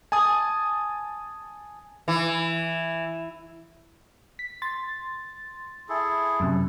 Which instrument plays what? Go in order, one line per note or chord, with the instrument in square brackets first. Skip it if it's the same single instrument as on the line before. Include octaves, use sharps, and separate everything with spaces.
[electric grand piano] G#5 A5 D#6
[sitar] E3
[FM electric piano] B6
C6 A6
[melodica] E4 G#4 A4
[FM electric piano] F#2 C3